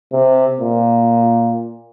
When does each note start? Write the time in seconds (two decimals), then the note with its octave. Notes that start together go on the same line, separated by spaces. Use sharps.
0.12 C3
0.60 A#2